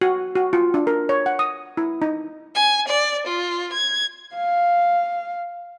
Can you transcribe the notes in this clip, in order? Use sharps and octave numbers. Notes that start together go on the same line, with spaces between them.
F#4
F#4
F4
D4
A#4
C#5
F#5
D#6
E4
D#4
G#5
D5
F4
G#6
F5